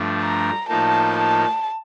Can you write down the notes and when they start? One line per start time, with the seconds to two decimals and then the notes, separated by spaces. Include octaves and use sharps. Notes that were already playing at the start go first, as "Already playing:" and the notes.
Already playing: G2 F3 A3 D4
0.22 A#5
0.69 A2 F3 A#3 D#4 A5
1.18 A5